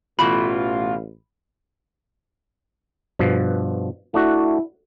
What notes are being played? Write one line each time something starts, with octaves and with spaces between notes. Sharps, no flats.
A1 B2 E3 A3 F4 B5
G2 B2 F3
A3 D4 E4 F#4